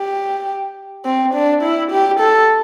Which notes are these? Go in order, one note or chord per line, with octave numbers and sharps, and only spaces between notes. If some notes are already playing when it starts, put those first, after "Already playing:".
Already playing: G4
C4
D4
E4
G4
A4